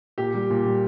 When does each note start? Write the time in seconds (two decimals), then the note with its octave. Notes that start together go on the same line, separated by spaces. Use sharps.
0.18 A#2 G4
0.34 G3
0.50 A#2
0.66 G3